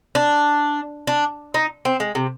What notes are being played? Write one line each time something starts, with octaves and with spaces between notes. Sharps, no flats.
D4
D4
D#4
C4
G#3
C3